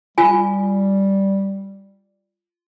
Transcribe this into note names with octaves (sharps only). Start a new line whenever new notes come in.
G3 F4 G#5